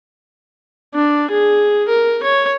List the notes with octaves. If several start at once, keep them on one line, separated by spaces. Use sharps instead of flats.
D4
G#4
A#4
C#5